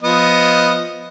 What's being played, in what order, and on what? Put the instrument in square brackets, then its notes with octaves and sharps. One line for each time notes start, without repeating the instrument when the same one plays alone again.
[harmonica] F3 B3 D#5